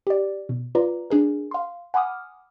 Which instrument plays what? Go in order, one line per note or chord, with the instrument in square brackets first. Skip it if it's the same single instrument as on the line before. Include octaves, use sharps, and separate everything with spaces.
[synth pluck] G4 D5
B2
F4 B4 D5 A#5
D4 G#4 A#4
F5 C6
F#5 G#5 B5 D6 D#6 F6